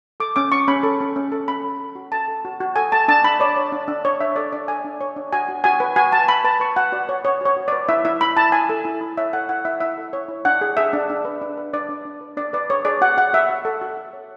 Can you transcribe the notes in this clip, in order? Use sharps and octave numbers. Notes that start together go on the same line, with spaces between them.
A4 D6
C#4 D6
C#4 C#6
C#4 B5
A4
C#4
C#4
A4
C#4 B5
A4
A4
F#4
A4 A5
A4
F#4
F#4
A4 G#5
A4 A5
D4 A5
D4 B5
C#5 D5
C#5
D4
D4
C#5
D4 E5
A4 D5
D4 D5
A4 G#5
D4
C#5
D4
F#4 G#5
F#4
F#4 G#5
B4
F#4 G#5
F#4 A5
F#4 B5
B4 A5
B4 C#6
F#4 F#5
F#4 D5
B4 C#5
B4 C#5
F#4 C#5
F#4
B4 D5
E4 E5
E4 E5
E4 B5
E4 A5
E4 G#5
A4
E4
E4
C#5 E5
A4 F#5
E4 F#5
E4 E5
E4 E5
A4
C#5
E4
D4 F#5
G#4
G#4 E5
D4
D4
B4
D4
B4
D4 D5
D4
D4
B4
D4 D5
B4 D5
G#4 C#5
G#4 D5
F#4 F#5
F#4 F#5
F#4 E5
F#4
A4
F#4
F#4
C#5